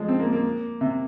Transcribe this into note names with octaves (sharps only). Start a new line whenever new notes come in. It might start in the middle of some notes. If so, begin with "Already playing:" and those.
Already playing: F3 G#3
C4
A#3
A#3
C3